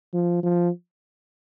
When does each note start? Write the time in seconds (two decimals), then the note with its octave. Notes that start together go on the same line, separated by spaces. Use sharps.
0.14 F3
0.43 F3